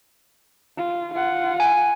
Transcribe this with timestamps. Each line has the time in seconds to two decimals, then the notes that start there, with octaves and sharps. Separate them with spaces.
0.78 F4
1.14 F4 F#5
1.60 G#5